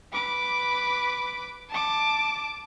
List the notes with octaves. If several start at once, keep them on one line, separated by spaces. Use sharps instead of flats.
B4 D6
A5 D6